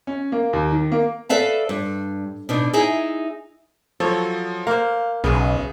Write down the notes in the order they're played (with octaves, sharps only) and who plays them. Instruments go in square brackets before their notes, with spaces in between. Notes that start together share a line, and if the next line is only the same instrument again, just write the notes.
[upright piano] C#4
A#3
D#2
D#3
A#3
[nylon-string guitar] A4 B4 D5 E5 F5 A5
G2
B2 D4 D#4
D#4 E4 G#4 E5
[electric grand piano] F3 F#3 [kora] A4 C#5
[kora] A#3 C5 [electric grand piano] F5
[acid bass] B1 [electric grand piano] C#3 [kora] B3 G#4 E5